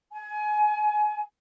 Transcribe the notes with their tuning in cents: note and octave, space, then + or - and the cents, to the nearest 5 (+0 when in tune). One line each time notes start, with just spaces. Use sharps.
G#5 +25